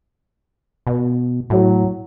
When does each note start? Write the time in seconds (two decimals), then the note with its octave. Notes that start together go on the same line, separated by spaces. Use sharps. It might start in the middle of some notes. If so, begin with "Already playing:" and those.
0.87 B2
1.50 A2 F#3